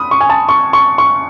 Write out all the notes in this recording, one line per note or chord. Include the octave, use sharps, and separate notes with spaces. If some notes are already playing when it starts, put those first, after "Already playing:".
Already playing: B5 D#6
C#6
G#5
A5
C#6
C#6
C#6